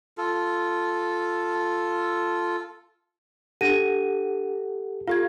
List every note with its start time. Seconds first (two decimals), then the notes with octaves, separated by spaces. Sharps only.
0.18 F4 A4
3.61 D4 G4 A4 F#5 A#6 D#7
5.08 F4 G4 A4 F5 G#6